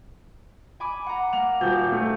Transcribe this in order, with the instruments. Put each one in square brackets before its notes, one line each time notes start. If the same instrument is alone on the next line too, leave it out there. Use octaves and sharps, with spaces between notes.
[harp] G#5 B5 D6
F#5 A#5
[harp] A#3 [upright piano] F7
[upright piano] D#1 G6 [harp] F#4
[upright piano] A3